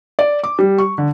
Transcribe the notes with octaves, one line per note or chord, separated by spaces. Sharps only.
D5
D6
G3
C#6
D3